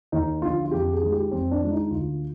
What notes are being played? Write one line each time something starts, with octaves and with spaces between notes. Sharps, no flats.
D#2 D#4
D3 F3 F4
F4
F2 G4
G#4
D#3 G#3
G4
F2 C4
D4
D#3 G#3 F4
D#4
D2 F4